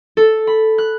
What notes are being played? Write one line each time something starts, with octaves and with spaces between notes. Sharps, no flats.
A4
B5
F#6